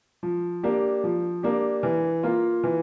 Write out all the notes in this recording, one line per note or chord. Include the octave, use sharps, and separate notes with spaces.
F3
A#3 D4 G4
F3
A#3 D4 G4
E3
A#3 F4
E3